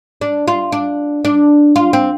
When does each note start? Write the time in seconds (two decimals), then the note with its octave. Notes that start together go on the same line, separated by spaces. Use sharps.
0.21 D4
0.48 F4
0.72 D4
1.25 D4
1.76 F4
1.93 C4